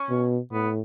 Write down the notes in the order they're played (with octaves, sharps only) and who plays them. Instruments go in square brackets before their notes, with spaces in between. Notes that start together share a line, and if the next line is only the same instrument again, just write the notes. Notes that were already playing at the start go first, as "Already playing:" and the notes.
Already playing: [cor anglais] C#4
[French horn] B2
[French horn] A2 [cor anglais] B3